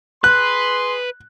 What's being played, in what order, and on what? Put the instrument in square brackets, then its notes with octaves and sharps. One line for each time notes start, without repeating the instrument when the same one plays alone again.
[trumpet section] G#4 C6 [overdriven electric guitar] B4 [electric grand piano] F#6